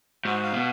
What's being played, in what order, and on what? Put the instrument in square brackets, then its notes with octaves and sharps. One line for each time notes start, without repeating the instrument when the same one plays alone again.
[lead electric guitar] G#2 [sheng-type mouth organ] F#4
[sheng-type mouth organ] F5
[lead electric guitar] B2